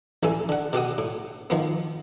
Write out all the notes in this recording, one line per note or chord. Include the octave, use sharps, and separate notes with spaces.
A1 E3 A4 G#5
D3 F#5
B2 G4 F#5 D#6
A2
D#3 F3 B3